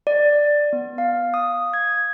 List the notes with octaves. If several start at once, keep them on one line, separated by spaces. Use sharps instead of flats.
D5
B3
F5
D#6
G#6